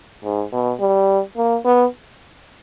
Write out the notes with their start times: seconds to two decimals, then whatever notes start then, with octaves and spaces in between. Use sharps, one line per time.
0.23 G#2
0.52 B2
0.80 G3
1.37 A#3
1.65 B3